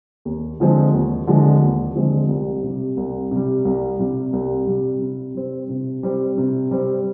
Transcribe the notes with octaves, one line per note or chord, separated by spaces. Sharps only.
D#2
D3 F3 G#3 C4
D#2
D3 F3 G#3 C4
D#2
D3 F3 G#3 C4
C2
C3 G3
C2
C3 G3
C2
C3 G3
C2
C3 G3
C3
G3 C4
C3
G3 C4
C3
G3 C4